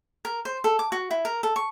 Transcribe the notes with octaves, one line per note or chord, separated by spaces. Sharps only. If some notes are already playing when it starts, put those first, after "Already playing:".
A#4
C5
A4
D6
F#4
E4
A#4
A4
C#6